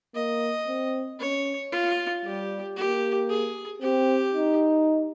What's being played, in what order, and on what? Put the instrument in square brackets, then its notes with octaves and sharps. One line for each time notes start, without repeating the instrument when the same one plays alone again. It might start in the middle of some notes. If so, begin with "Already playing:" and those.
[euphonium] A#3 [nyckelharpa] D#5
[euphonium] C4
[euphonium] C#4 [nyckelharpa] C#5
[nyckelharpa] F4
[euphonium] G3 [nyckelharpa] G4
[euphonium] A#3 [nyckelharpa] G4
[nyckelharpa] G#4
[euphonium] C4 [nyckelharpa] G4
[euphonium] D#4